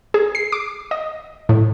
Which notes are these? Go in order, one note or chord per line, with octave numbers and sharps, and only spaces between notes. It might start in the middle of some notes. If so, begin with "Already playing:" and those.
G#4
C7
D6
D#5
A2